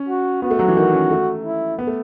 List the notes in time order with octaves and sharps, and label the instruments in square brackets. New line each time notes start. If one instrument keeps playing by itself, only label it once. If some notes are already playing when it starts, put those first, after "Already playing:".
Already playing: [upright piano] C#4
[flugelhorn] F#4
[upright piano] B3 [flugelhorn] F#4
[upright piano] A3
F#3
E3
D#3
C#4
A3
[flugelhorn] E4
[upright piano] B3
A3